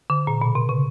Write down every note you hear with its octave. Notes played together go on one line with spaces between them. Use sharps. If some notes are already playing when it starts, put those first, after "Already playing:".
D3
A#2
B2
C3
C#3